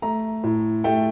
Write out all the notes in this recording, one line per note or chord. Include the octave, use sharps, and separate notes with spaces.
A3 A#5
A2
A3 G5